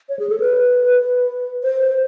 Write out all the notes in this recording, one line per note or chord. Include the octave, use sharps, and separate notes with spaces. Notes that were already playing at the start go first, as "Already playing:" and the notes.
C#5
G#4
A4
B4
C5